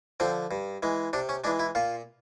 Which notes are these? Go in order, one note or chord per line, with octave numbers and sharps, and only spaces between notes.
D3 F3 C4
G2
E3 G#3
C3 D4
C#4
E3 G#3 D4
E4
A#2 F4